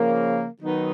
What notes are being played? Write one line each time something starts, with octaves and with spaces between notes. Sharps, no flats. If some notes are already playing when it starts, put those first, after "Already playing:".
Already playing: C#3 F3 A#3
D#3 F#3 B3 D#4